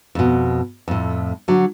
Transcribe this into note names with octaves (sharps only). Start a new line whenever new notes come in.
F2 B2
F2 A2
D3 F#3